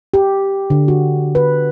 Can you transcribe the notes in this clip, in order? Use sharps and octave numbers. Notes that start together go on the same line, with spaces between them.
G4
D3
F#4
B4